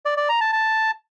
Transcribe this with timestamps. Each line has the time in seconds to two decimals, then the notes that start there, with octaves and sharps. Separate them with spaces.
0.05 D5
0.17 D5
0.29 A#5
0.41 A5
0.53 A5